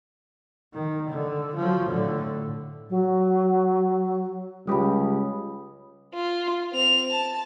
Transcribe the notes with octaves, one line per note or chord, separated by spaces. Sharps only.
D#3
D3
F3 F#3
A2 D3
F#3
C#2 G3 G4 B5 D#6
F4
C4 F7
A5